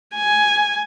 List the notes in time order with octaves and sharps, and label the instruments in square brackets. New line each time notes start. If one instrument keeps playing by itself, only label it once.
[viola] G#5